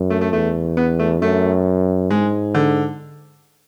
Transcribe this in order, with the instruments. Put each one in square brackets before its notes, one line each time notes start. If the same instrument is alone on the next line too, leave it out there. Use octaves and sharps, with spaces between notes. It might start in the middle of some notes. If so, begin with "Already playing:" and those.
Already playing: [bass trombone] F#2
[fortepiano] A3
A3
[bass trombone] E2 [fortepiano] A3
[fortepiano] B3
A3
[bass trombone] F#2 [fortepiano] A3
[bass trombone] G#2 [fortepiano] G#3
[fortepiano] D3